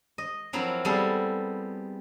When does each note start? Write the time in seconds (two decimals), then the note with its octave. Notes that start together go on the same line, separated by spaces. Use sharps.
0.18 D#5
0.53 F3 F#3 C4 E4 A#4
0.85 G3 B3 C4 G#4 A4